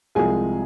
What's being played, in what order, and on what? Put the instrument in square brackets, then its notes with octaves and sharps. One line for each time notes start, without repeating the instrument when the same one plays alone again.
[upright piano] C2 C3 F3 G#3 G#4 G#5